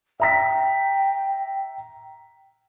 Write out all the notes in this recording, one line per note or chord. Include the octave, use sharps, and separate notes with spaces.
E5 G5 A#5 B6